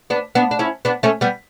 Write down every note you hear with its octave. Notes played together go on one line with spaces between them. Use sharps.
B3 D4
B3 D4
D4
C#4 E4
B3 D4
A3 C#4
G3 B3